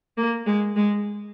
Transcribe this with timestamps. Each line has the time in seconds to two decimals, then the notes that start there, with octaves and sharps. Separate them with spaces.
0.17 A#3
0.46 G#3
0.76 G#3